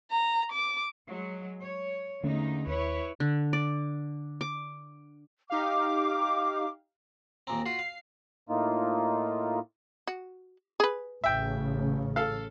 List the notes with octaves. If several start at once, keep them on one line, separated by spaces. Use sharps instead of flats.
A#5
D6
F#3 G#3
C#5
E2 D3 A3 A#3 C#4 D#4
D#2 E4 B4 C#5
D3
D5
D6
D#4 G4 F5 D6
D#2 A#2 C4 A#5
F4 F#4 C7
F5
A2 A#3 D#4 F4
F#4
G#4 B4
A1 C#3 E5 G5
A4 F5